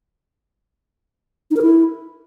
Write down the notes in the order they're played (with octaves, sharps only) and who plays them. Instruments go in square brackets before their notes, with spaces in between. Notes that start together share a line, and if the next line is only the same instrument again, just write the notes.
[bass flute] D#4
A#4
E4